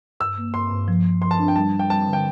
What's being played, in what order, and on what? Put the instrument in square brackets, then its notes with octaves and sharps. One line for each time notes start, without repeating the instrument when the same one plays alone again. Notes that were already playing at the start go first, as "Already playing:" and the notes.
[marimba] G2 [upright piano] E6
[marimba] A#3
[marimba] G2 [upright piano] C6
[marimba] G2
F3
F3
[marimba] F3 [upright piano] C6
[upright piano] A5
[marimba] D4
[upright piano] G5
[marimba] G3 [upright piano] A5
[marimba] G3
[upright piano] G5
[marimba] G3 [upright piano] A5
[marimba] D3
[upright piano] G5